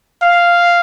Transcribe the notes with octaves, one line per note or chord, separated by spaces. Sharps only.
F5